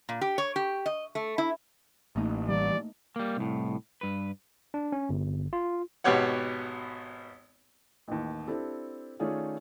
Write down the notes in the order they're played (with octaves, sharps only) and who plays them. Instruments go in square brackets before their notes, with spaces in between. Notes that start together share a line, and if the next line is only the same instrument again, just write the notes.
[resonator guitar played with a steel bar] A#2
G4
C#5
G4
D#5
A3
E4
[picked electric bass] A1 [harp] A3 A#3 D#4
[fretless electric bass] E3 G3 [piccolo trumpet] D5
[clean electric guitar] G3 A#3
C2 A2
G2 B4
[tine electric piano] D4
C#4
G1
F4
[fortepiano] G#1 B2 B3 G4 C#5 F#5
[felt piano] A1 D#2
C4 D4 E4 G4 A4
D#3 A3 C#4 F4 G#4 D5